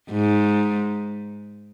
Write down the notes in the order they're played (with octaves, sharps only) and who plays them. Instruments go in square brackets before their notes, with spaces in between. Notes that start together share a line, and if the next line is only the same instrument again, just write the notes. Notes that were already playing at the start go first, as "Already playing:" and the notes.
[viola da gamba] G#2